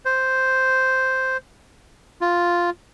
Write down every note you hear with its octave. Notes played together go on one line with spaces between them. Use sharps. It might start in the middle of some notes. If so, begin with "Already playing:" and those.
C5
F4